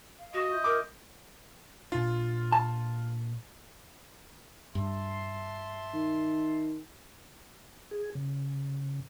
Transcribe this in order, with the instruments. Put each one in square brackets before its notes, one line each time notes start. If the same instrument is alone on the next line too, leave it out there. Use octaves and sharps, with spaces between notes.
[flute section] F5
[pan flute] F#4 [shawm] D#5
[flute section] F4 E5 G6
[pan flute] A#4 [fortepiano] D6
[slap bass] A#2 D4 [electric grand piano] F4
[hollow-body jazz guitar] A5
[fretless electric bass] G2 [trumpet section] E5 A5 C6
[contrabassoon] D#3
[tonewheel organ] G#4
C#3